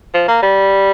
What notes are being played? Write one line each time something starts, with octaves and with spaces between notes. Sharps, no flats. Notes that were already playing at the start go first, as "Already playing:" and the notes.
F3
A#3
G3